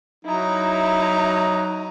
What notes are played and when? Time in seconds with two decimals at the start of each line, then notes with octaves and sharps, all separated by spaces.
0.25 F#3 D#4 E4 A#5